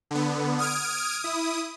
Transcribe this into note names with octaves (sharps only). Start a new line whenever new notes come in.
D3 B3
D#6 F6 G#6 D7
E4 D#6